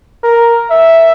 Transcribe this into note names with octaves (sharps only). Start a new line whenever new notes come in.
A#4
E5